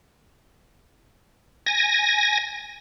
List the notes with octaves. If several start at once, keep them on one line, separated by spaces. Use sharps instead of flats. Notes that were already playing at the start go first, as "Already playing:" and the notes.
G#5 A#6